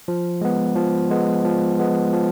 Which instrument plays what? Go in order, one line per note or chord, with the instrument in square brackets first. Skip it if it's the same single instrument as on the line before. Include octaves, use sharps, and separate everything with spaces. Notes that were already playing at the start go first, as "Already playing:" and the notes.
[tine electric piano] F3
G#3 B3
F3
G#3 B3
F3
G#3 B3
F3